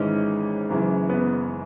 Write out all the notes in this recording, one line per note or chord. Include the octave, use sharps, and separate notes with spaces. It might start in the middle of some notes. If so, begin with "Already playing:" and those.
Already playing: G#1 G#2 E3 G#3 C#4
F#1 F#2 C#3 E3
B3